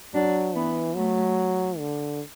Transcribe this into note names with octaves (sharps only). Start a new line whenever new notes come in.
F#3 D4
E3 B3
F#3 A3
D3